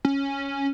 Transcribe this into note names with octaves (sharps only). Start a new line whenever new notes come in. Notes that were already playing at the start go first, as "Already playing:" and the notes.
C#4